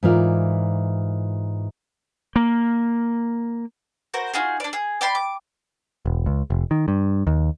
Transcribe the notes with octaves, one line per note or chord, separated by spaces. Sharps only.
G#2 E3 F4 A#4 D5
A#3
F#4 A#4 C5
D#4 F4 F#4 G#4
D4 D5
G#4
D5 G5 B5 C6
D6
E1
C#2
F1
D#3
G2
D#2